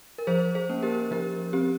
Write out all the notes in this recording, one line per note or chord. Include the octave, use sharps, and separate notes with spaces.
A#4
F3 G#4 C5
G#4 C5
A#3 C#4
G4 A#4
F3 G4 A#4
C4 G4